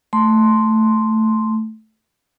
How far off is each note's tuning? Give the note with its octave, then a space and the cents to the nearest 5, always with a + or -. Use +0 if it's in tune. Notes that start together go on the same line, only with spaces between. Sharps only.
A3 +0 C6 +0